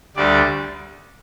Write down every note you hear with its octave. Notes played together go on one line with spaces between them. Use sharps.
D2 D3 G3 D5